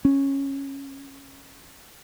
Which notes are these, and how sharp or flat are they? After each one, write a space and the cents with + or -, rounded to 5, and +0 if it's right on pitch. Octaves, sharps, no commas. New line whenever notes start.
C#4 -10